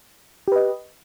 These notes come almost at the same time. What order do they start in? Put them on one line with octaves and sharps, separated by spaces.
G4 B4 D#5